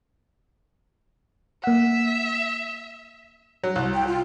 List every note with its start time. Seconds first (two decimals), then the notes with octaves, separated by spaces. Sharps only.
1.64 A#3 E5 F#5
3.64 F#3
3.76 C2
3.94 G5
4.07 F4